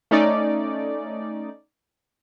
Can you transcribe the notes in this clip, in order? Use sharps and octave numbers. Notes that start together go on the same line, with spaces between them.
A3 C#4 D#4 D5